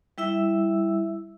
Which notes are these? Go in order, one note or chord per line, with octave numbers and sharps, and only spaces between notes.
G3 E4 E5 E6